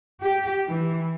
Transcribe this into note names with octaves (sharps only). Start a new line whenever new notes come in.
G4
E3